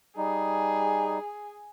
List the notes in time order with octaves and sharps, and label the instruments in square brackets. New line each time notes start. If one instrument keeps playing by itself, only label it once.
[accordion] G3 D#4 [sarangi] G#4